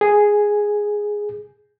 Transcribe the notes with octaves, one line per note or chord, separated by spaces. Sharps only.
G#4 G#5